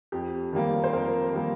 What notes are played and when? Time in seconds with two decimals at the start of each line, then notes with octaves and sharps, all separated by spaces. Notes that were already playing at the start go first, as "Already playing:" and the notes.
0.12 F2 G4
0.53 D#3 G3 A#3
0.84 C5
0.93 F2 A#4
1.33 D#3 G3 A#3